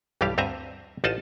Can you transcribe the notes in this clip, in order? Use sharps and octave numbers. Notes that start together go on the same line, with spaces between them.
B1 G2 E3 G3 G4 F5
D2 G2 C4 D#5 E5 A#5
A1 D#4 F4 D#5 F#5 A5